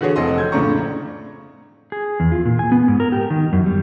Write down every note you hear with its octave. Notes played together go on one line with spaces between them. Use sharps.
D3 E3 F#4 G#4 C#5
F1 C3 A4 D#5 C6
G6 G#6
F2 A2 C#3 D4 A#5 C#6
G#4
E2
F4
A#2
G#5
B3
G#2
A#4
G4
D#3
F#2
G3